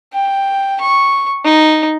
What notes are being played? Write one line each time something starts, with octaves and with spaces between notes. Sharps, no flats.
G5
C#6
D#4